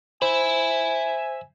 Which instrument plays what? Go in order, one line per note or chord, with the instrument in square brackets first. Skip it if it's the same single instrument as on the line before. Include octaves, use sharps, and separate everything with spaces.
[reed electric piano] C5 [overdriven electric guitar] E5 B5 [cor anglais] G#5